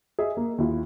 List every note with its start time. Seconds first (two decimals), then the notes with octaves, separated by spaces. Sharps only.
0.19 G#4 D#5 E5
0.37 A#3
0.58 D#2 E4 F4